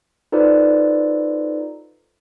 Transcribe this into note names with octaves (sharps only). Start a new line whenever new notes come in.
D#4 F4 A4 B4 C5 D5